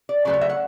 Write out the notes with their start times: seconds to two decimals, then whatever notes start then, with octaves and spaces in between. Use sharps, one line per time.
0.09 D5
0.25 C#3 F#3 A3 B4 D5
0.33 C#5
0.41 E5
0.49 F#5